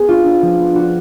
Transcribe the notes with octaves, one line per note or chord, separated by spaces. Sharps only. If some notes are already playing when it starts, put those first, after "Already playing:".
Already playing: B3 G#4
D4 F4
D4
F3
B3
D4 F#4